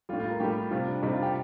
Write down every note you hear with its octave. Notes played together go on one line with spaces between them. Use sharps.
A2 G3 F4
F4
A#4
A2 G3 G4
C3 G3 F4
D4
C3 G3 D#4
F4
G4